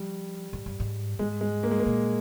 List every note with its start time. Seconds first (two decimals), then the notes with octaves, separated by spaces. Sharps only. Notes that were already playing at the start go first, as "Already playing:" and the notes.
Already playing: F3 G3
0.53 G#2
0.66 G2
0.80 G#2
1.19 G#2 G#3
1.41 G#3
1.63 A#3
1.71 G#3
1.79 A#3
1.86 A#2